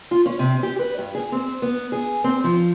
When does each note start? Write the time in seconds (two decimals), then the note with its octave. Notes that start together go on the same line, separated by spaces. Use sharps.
0.11 F4
0.26 C#4
0.39 C3
0.63 G4
0.79 B4
0.98 G2
1.15 G#4
1.32 C4
1.62 B3
1.92 G#4
2.24 C4
2.44 F3